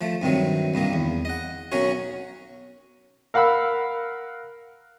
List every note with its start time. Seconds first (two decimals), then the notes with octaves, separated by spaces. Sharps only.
0.01 F3 A3
0.22 G2 C3 D#3 F#3
0.74 C2 G2 D#3 A#3
0.93 E2
1.25 D#5 F#5
1.72 B1 F#3 C#4 F#4 A#4 C#5
3.34 A#4 F5 F#5 B5 E6